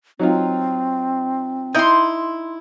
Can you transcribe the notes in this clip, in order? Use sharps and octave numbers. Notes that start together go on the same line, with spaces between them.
F#3 C4 D#4 F4
D#4 E4 C6 G6